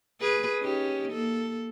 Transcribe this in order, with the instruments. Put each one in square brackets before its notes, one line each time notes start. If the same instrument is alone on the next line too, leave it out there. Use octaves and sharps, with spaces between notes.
[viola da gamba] G#4 B4
C#4 D#4 G4
A#3 A4